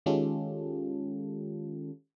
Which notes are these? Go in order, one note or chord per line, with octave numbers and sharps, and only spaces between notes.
D#3 G#3 C#4 F4 G4 A4